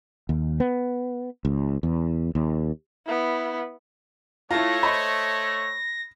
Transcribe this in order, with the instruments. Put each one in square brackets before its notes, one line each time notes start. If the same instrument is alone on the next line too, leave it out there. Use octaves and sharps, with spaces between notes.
[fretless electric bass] D#2
B3
C#2
E2
D#2
[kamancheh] B3 E4
[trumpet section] A3 C#5 [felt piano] E4 A5 [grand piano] F4 [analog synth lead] A#6
[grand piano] C5 D#5 [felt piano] B5